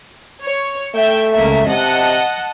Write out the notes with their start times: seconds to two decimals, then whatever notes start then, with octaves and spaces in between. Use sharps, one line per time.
0.43 C#5
0.94 A3 E5 G5
1.33 C#2 A#3 E5
1.67 C3 D#5 F#5 A5